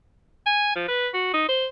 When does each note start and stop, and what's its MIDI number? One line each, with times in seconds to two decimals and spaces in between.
0.46 0.72 80
0.75 0.84 53
0.88 1.08 71
1.14 1.29 66
1.34 1.46 63
1.48 1.66 72